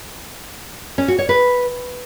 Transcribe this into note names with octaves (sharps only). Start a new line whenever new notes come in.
C#4
F#4
C#5
B4